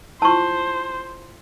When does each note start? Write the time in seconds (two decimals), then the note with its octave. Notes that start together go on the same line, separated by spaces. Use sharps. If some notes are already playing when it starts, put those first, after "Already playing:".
0.22 E4 F4 C5 A5 C#6